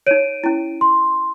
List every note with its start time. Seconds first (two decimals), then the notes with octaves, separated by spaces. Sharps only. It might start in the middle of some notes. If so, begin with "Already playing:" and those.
0.07 D#4 C#5 D7 D#7
0.44 C#4 E4
0.81 C6